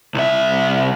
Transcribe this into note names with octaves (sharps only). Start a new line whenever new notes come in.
C2 E5